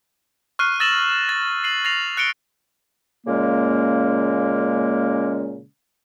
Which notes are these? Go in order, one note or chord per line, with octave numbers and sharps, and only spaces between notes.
C#6 F6 F#6 C7 D#7
D#6 E6 A6 A#6 E7 F#7
A6 E7
C7 D#7 F#7
A6 A#6 C7 F7
F#6 C#7 D7 G7
A#2 C#3 G#3 A#3 C#4